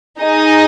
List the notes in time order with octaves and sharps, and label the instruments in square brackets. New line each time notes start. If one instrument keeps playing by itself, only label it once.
[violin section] D#4 G#4 D#5